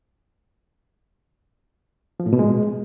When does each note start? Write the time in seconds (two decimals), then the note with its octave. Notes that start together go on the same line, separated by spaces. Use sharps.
2.20 F3
2.26 A2
2.33 B2
2.39 G#3